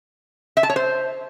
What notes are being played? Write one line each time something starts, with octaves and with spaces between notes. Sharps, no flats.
E5
A5
C#5
C5